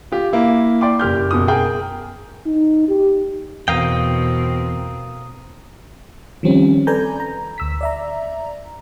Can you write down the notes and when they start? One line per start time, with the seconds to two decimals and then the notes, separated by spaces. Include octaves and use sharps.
0.12 F4 G4
0.33 A#3 E4
0.81 D5 G5 C6 D6
0.99 F#1 G4 F6 G6
1.31 F#1 B2 D#6
1.48 G#4 A#4 G5 G6
2.46 D#4
2.88 G4
3.68 E2 B2 C4 A#4 F5 G5 D#6 D#7
6.43 D#3 F3 G3 C4 C#4
6.87 A4 B4 D5 G#5 A#5 G6
7.20 A#5
7.58 D2 E6 B6
7.81 D5 E5 A#5